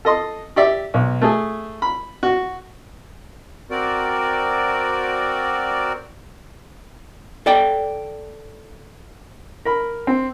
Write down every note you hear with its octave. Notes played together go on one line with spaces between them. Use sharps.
A4 D#5 C6
G4 D5 E5
B1
A3 G#4
B5
F#4
C4 F#4 A#4 D5
A4 D5 G5
A#4 B5
C4